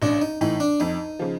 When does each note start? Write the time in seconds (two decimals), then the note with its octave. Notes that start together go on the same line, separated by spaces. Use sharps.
0.02 A1 D4
0.21 D#4
0.41 A2 E3 D#4
0.60 D4
0.80 F2 D#4
1.19 C#3 F3